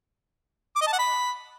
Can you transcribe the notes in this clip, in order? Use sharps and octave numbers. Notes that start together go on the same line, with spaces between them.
D6
D#5
A5
F#5
B5